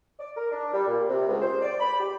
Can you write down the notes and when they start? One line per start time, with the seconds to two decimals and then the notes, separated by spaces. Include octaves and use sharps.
0.19 D5
0.37 A#4
0.51 D4
0.73 G3
0.87 A#2
1.08 C3
1.29 C#2
1.42 C5
1.62 D5
1.80 B5
2.00 G4